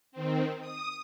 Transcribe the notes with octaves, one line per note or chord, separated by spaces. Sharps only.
D#3 C4
D#6